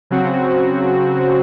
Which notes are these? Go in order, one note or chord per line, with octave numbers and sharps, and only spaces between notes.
C#3 F#3 C4 F#4